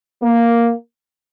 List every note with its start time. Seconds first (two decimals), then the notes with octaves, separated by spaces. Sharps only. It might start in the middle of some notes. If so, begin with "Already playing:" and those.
0.22 A#3